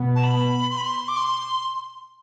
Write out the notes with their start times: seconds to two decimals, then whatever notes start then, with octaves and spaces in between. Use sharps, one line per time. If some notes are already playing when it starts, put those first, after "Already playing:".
Already playing: B2 B3
0.15 A5
0.23 B5
0.70 C6
0.77 B5
0.84 C6
1.08 D6
1.17 C6